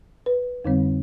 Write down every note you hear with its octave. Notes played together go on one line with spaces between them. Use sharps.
B4
F2 D3 G3 C4